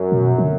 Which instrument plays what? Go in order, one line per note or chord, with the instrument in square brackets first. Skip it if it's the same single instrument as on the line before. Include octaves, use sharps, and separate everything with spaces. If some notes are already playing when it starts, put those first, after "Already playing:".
Already playing: [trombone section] F#2
[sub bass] B2
F3
D3